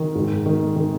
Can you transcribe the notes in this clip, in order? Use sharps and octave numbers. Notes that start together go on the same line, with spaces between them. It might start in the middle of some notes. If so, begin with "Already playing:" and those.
Already playing: D#3
G#2
D#3
D#3